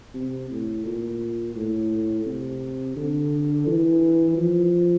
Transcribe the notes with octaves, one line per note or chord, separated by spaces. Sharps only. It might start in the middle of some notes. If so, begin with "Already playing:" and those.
C3
A2
A#2
A2
C3
D3
E3
F3